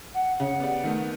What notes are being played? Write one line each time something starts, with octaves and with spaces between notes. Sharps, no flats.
F#5
C#3
B3 G4 D5
D#3 A3 B3